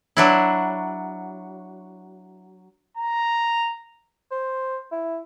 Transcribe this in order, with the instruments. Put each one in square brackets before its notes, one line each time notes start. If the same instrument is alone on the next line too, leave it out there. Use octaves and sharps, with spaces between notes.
[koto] F#3 D4 E4
[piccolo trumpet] A#5
[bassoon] C5
E4